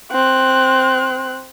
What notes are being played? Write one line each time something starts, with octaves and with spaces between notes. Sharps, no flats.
C4 F#6